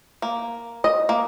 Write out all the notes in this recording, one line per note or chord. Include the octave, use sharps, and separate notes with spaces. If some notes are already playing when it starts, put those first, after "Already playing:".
A#3
D#5
A#3